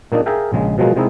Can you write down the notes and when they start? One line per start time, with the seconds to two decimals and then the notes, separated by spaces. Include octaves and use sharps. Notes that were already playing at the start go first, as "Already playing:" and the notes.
0.12 A#2 A#3 D4 D#4
0.26 G#4 A#4 E5 F5 G5
0.53 A#1 C#3 G#3
0.78 B2 F3 F#3 G#3 A#3
0.96 C3 G#3 C4 D#4 E4